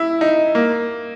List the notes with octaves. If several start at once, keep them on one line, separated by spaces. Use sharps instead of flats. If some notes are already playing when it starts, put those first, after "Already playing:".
Already playing: E4
D#4
A#3